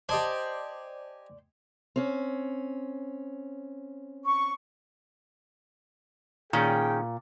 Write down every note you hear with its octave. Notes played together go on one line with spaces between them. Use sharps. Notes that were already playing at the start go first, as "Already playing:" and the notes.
G4 C5 D5 D#5 G#5 A5
C4 C#4
C#6
A#2 D#3 C#4 G#4 G5